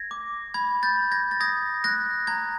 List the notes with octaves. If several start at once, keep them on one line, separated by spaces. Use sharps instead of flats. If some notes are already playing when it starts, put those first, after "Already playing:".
Already playing: G#6 A#6
D6
B5 G#6
G6 A6
B5
G#6 A#6
A6
D#6 G#6 A#6
F#6 G#6 A#6
A#5 G#6